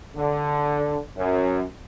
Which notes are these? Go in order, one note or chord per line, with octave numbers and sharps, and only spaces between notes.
D3
F#2